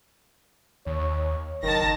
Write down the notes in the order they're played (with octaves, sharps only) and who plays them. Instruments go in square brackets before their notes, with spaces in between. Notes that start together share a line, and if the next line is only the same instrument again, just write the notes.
[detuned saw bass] D#2 [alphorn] C#5
[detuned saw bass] F#1 [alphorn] D#3 [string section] A5 A#6